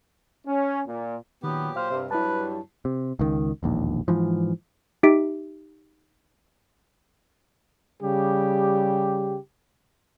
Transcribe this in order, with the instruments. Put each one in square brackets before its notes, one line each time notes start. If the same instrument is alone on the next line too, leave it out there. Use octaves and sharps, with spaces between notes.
[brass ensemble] C#4
A#2
[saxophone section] A#2 F#3 G4 [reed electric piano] D#3 [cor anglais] B3
[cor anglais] C5 [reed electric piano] F5 F6
[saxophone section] G2 C3
[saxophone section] G2 F#3 G3 [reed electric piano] E4 A5 [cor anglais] B4
[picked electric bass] C3
C#2 D#3
E1 A#1 D#2
G#2 E3 F3
[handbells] D#4 G4 E5 B6 D7
[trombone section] C#3 G3 G4